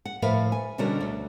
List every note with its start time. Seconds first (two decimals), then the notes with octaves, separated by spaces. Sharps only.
0.05 F#5
0.22 A2 F3 A#4 B4 E5 F5
0.52 G#5
0.78 B2 D3 G3 C#4 F#4 A#4
1.01 D2